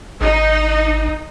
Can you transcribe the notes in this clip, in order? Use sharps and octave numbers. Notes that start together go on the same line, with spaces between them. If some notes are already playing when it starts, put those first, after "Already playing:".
G#1 D#4